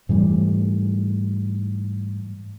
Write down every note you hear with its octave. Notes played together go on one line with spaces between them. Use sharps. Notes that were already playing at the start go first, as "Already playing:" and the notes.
G#2 E3 G3 A3